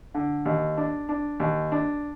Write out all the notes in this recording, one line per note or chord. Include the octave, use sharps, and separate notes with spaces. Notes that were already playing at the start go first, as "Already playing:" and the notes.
D3
D#2
D4
D4
D#2
D4